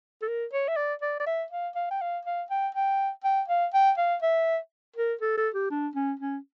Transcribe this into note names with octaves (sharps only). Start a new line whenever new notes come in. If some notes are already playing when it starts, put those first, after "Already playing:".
A4
A#4
C#5
E5
D5
D5
D5
E5
F5
F5
G5
F5
F5
G5
G5
G5
F5
G5
F5
E5
A#4
A4
A4
G4
D4
C#4
C#4